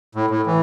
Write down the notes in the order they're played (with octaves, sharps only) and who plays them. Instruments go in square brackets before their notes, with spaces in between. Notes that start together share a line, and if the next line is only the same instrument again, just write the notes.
[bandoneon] A2
A2
E3